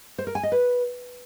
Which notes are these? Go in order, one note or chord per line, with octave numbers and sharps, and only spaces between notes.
C5
A#4
G#5
D#5
B4